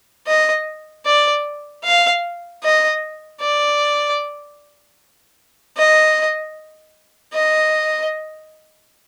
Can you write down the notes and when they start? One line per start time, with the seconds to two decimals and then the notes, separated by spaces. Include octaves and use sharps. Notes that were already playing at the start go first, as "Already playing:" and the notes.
0.27 D#5
1.06 D5
1.84 F5
2.63 D#5
3.41 D5
5.77 D#5
7.34 D#5